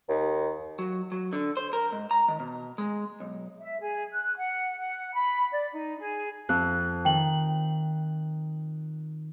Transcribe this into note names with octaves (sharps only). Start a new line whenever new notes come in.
D#2
F#3
F#3
D3
C5
A#4
G#2
A#5
D#3
B2
G#3
B1
E5
G#4
F#6
F#5
F#5
B5
D5
D#4
G#4
F2 F#6
D#3 G5 F#7